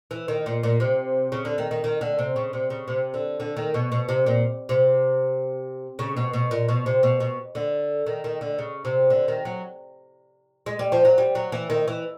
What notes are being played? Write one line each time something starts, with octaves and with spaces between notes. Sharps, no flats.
E3
D#3
A#2
A#2
C3
C#3
D3
D#3
D#3
D#3
D3
C3
C#3
C3
C#3
C3
D3
D3
D#3
B2
B2
C3
A#2
C3
C#3
B2
B2
A#2
B2
C3
B2
B2
D3
D#3
D#3
D3
C#3
C3
D3
D#3
F#3
G#3
G3
F3
F#3
G3
F#3
E3
D#3
E3